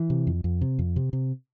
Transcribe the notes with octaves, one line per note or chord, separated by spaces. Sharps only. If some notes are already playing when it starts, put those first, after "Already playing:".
Already playing: E3
C3
F2
F2
C3
F2
C3
C3